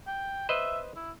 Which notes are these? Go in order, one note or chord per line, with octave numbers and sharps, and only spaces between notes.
G5
B4 C5 D#5 E5
E4